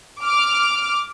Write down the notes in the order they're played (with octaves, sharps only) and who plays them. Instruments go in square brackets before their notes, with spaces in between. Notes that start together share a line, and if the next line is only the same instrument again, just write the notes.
[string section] D6 F6